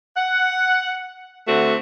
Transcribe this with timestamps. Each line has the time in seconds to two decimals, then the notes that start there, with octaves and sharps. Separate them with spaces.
0.17 F#5
1.48 D3 A3 C4 F#4